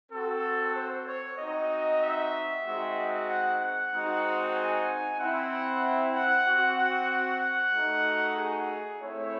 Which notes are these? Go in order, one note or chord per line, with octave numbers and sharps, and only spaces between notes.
C4 F#4 A4
C5
C#5
C4 D#4 F#4 D#5
E5
G#3 C4 D#4 F#4
F#5
F#5
G#3 C4 D#4 F#4
G#5
C4 E4 F#5
F#5
C4 F#4
F#5
F#5
A3 D#4 F#4
G#4
A3 C4 E4 C#5